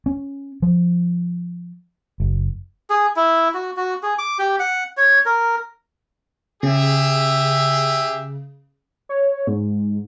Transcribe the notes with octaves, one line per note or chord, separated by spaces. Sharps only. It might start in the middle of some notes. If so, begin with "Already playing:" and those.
C#4
F3
F#1
G#4
E4
F#4
F#4
G#4
D6
G4
F#5
C#5
A#4
C#3 G4 G#4 E5
C#5
G#2